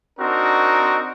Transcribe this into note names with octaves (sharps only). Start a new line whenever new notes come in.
C4 D4 D#4 F#4 A#4